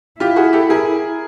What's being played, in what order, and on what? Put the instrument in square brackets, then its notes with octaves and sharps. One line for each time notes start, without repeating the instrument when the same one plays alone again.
[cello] E4 [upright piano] F4 G4
[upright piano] F#4 G#4
G4 A4
G#4 A#4